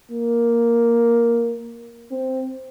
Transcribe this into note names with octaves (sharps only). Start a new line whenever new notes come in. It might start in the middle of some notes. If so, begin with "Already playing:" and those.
A#3
C4